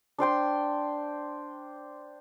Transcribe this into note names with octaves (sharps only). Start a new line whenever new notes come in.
D4 C5 G5 C6